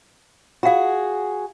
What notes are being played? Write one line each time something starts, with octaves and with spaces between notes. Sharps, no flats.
F4 F#4 G#4 F5